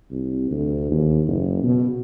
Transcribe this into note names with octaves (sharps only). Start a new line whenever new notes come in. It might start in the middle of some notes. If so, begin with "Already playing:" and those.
C2
D2
D#2
F#1
B2